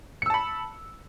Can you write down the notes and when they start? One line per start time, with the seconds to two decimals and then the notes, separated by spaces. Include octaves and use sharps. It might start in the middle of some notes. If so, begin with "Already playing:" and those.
0.22 C#7
0.26 E6
0.30 A5
0.34 B5